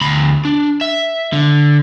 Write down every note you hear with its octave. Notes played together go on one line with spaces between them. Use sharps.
D2 B5
D4
E5
D3